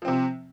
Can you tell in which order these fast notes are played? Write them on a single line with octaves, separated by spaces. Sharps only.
F3 C4 C3